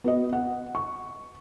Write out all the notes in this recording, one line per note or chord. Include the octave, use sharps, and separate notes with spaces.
B3 F#4 D#5
F#5
C#6